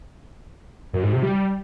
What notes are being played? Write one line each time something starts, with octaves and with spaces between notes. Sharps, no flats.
F#2
G#2
C3
G3